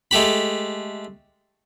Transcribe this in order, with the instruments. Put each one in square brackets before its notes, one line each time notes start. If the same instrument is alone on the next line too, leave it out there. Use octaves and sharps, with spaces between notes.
[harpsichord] G#3 A3 G4 B5